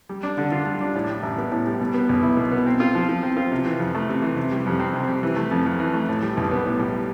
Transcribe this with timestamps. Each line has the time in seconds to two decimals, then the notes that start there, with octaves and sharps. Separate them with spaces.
0.09 G3
0.23 D4
0.38 D3
0.52 F4
0.66 G3
0.80 D4
0.95 A2
1.08 G3
1.23 A1
1.38 B3
1.52 A2
1.67 G3
1.80 B2
1.94 B3
2.09 B1
2.23 E4
2.37 B2
2.52 B3
2.67 C4
2.80 F4
2.95 F3
3.09 F3
3.23 C4
3.37 F4
3.52 C3
3.66 E3
3.79 F2
3.95 A3
4.09 C3
4.22 E3
4.37 C3
4.52 G3
4.66 F2
4.80 C4
4.94 C3
5.08 G3
5.23 E3
5.36 A3
5.51 F2
5.66 F2
5.80 E3
5.93 A3
6.09 A2
6.22 G3
6.37 B1
6.51 B3
6.66 A2
6.79 G3